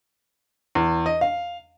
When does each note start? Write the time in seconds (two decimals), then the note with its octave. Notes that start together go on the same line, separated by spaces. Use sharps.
0.75 E2
1.06 D#5
1.21 F5